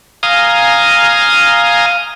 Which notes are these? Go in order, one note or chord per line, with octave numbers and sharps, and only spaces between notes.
F5 G#5 A#5 D#6